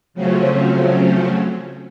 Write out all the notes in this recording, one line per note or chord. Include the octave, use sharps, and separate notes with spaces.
C#3 F3 F#3 A3 C4 C#4